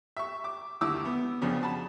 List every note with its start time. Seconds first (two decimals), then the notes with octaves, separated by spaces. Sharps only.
0.17 E5 C#6
0.44 D6
0.81 D#2 D3 E4 D6 E6
1.05 B3
1.41 F2 C#3 F3 B3 D4
1.61 F#4 A5 B5